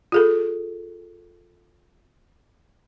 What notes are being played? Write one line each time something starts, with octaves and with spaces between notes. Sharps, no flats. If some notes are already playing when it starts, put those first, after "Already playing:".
F4 G#4 A4